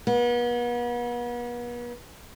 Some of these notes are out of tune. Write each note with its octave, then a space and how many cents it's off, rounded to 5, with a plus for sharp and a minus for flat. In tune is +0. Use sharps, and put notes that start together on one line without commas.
B3 -40